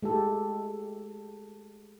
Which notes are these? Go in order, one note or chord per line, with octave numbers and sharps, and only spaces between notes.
G#3 A3 G4 A4